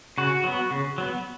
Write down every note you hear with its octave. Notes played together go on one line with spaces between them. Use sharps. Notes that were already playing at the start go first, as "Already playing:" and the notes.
C#3 F#4
F#3 B3
C#3
F#3 B3